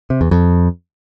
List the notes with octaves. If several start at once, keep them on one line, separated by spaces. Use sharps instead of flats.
C3
E2
F2